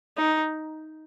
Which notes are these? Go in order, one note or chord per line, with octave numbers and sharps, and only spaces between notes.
D#4